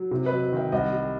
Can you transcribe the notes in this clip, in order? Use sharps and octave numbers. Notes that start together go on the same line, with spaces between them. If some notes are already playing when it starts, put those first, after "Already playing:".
Already playing: F#3
C3
B4 D#5
F#3
D#3 E5 G5
C2 D#5 F#5
G3